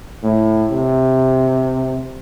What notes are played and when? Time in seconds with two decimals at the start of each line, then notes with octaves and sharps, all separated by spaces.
0.23 A2
0.71 C3